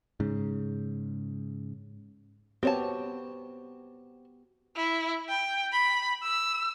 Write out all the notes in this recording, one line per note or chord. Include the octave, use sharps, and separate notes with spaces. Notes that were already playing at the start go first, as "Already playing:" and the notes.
G#2 C#3
B3 C4 F#4 G4 C#5 A5
E4
G5
B5
E6